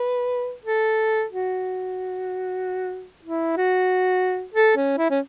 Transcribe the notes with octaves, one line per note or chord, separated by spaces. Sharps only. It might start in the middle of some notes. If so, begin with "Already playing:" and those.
Already playing: B4
A4
F#4
E4
F#4
A4
C#4
E4
C#4